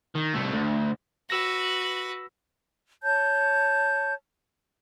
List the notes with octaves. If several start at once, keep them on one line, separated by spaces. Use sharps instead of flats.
D#3
C2 A3
D2
F#4 B4 E6 A#6
C#5 A5 G6